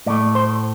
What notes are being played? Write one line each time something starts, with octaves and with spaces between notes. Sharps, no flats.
A2 A3 D5
C5